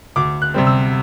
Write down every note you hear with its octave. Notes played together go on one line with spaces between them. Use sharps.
D2 D6
F#6
C3 G3 C4
E6